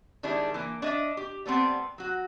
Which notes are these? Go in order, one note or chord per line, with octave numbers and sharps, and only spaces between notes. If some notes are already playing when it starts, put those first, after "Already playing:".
D#3 G3 G#3 D4 E4
E3 A#3
D4 D#5 E5
G4
G3 A3 B3 C4
F#3 F#4